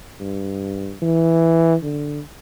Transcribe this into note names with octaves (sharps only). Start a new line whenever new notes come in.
G2
E3
D3